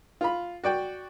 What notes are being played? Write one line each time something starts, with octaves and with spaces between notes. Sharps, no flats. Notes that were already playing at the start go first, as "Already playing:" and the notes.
F4 B5
F#4 D5 G5